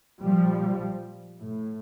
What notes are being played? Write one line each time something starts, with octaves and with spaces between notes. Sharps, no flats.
A#2 F3 G3
A2